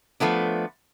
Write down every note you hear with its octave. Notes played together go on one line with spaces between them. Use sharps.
F3 A3 B3 D4